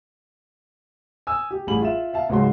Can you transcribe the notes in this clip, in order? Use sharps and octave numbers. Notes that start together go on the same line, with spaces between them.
G#5 D#6 E6
G4
A1 G3 G#4 B5 F#7
F4 E5 E7
E5 F5 A5
C#2 G#2 F#3 G#3 C6